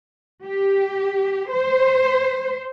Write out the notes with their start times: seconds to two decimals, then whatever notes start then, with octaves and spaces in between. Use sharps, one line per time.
0.45 G4
1.52 C5